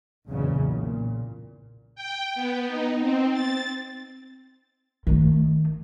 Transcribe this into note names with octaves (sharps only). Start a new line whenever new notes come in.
B1 E2 A#2 C#3
A#2
G5
B3
D#4
C4
A6
D#3 A3